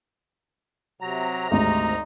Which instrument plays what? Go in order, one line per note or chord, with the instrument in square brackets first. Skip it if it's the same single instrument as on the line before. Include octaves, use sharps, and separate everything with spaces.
[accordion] C3 A#5 [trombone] F#3
[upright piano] G#1 D2 [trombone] D#4